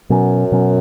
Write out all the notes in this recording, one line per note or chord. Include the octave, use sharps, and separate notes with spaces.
F#2 B2 F#3 C#4
B2 F#3 C#4